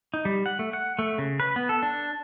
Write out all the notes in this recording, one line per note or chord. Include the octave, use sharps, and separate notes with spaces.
D#4
G3
F#5
A3
F#5
A3
C#3
B4
B3
A4
D4